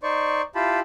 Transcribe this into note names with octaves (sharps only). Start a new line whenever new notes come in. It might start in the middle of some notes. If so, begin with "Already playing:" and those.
D#4 C5 D5 C#6
E4 F4 G4 A5 B5